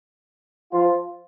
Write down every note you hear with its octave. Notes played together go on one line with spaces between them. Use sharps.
F3 F4